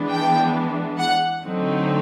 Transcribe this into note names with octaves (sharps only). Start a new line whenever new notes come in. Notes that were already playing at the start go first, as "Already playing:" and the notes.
Already playing: E3 G#3 B3 D4
G5
F#5
D3 F#3 A3 C4 D#4